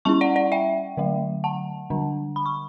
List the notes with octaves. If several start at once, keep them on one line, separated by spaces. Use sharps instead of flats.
G3 C#4 E4 A5 C#6
D5 F#5
D5 F#5
E5 G5
D3 F#3 A3
F#5 A5
D3 G3 D4
B5
C#6